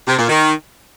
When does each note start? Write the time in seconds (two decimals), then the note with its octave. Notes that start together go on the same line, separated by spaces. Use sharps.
0.07 C3
0.18 A#2
0.29 D#3